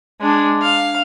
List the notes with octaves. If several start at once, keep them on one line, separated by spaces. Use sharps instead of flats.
G#3 D4
F5